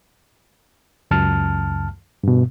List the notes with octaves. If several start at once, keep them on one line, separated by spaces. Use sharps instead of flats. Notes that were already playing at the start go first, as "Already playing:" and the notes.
C#2 F#2 A5 F6
G2 B2